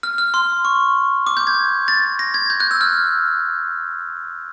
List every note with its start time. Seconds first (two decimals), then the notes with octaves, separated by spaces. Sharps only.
0.03 F6
0.18 F6
0.34 C6
0.65 C#6
1.27 D6
1.37 G6
1.47 G#6
1.88 A6
2.19 A#6
2.34 G#6
2.50 G6
2.60 F#6
2.71 E6
2.81 F6